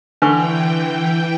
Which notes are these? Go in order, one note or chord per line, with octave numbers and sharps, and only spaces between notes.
D3 E3 D4 B4 G5 C#6